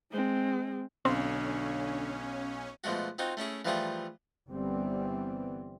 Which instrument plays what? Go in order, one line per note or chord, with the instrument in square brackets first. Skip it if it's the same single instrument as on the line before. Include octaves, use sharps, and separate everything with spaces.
[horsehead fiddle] G#3 C4
[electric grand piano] B1 F5 [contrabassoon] D3 [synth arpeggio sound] C4 [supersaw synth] C#4
[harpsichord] B2 F3 G#3 A3 F#4
C4 D#4 F4 F#4
A3 C#4 E4 G#4
E3 F3 G3 A3 F4 G#4
[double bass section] G1 E3 G3 B3 C4